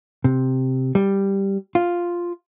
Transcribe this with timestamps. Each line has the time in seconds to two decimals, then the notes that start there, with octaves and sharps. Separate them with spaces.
0.24 C3
0.95 G3
1.75 F4